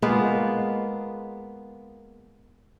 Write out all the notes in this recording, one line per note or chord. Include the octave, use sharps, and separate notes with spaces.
G#3 A#3 B3 F4